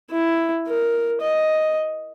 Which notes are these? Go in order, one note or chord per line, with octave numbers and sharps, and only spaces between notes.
E4
A#4
D#5